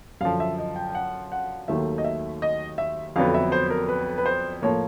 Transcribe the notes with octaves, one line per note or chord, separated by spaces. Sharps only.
F#2 D3 F3 F5
E5
D#5
G5
G5
F#5
F#5
D#2 D#3 F#3 A3 E5
D#5
E5
D#5
E5
F2 D3 F#3 B3 F5
E5
C5
A#4
B4
B4
C5
A2 F3 A#3 C#5